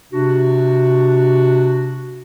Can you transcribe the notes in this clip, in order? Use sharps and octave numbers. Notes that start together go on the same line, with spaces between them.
C3 D4 F#4